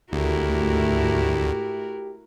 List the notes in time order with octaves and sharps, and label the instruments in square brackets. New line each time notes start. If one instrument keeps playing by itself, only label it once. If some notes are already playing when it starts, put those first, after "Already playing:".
[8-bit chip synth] D2 [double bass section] G#2 A3 [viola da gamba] E4 F#4 A#4 [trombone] G4